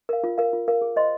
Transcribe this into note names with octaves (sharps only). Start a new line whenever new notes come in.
A#4 F5
F4
A#4 F5
F4
A#4 F5
G#4
C5 D#5 C6